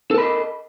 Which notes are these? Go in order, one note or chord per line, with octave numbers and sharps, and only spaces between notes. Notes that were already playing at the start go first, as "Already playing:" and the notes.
A4 A#4 D#5 B5